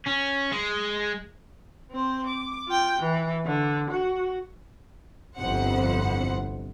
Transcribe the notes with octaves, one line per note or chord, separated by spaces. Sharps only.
C#4
G#3
C4 C5
D6
F4 G5
E3
D3
F#4
G1 C2 F2 C5 F#5 C#7